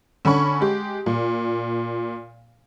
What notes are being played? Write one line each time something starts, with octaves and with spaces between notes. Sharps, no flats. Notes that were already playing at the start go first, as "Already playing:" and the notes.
D3 C#4 B5 C#6
G#3 G4
A#2